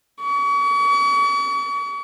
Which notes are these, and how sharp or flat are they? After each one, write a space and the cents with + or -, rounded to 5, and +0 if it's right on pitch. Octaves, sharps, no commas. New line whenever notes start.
C#6 +40